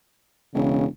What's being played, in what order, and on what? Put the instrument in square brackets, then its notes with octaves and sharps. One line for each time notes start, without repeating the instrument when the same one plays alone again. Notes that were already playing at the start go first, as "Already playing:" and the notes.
[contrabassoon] E1 [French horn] C#3